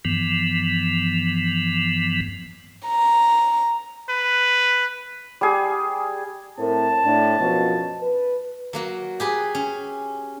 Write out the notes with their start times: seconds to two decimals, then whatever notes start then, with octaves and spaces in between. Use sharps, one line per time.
0.05 G2 E3 F3 B3
2.87 A#5
4.09 B4
5.41 G3 G#4
6.58 A2 C4 A#4 A5
7.03 A2 D4
7.39 F#2 B2 F3
8.03 B4
8.73 F#3 A#3 F#4
9.20 G4 G#4 B4
9.55 C#4